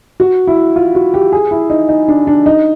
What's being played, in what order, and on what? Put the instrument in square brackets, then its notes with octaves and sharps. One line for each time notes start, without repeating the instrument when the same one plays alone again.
[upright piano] F#4
E4
F4
F#4
G4
G#4
E4
D#4
D#4
D4
D4
D#4